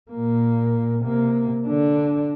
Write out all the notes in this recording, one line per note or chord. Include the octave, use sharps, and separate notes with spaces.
A#2 A#3
C3 A#3
D3 D4